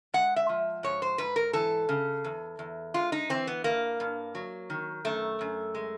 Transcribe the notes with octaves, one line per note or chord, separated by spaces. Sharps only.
G#3 F#5
E5
F3
G#2 C#5
C5
G#2 B4
A#4
E3 A4
C#3
E2
E2
G#3 F4
D#4
E3 C4
B3
G2 A#3
G2
F#3
D#3
F#2 A3
F#2
G#3